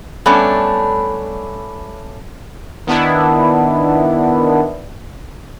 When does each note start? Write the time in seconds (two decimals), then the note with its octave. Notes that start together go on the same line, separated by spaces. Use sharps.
0.26 G3 A3 B3 C#4 D4 A4
2.87 D#3 B3 D4 E4